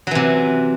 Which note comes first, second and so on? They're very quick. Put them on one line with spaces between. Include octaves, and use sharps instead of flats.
F#3 E3 C3